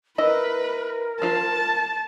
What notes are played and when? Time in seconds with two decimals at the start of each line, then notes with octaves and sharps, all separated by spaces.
0.18 E4 A#4 B4 D#5
1.22 F3 F4 C5 A5